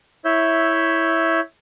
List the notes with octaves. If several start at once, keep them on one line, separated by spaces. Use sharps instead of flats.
E4 C#5 E5 G6